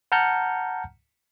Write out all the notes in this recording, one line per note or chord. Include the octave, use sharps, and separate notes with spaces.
F#5 A5 A#5 F6 G6 C#7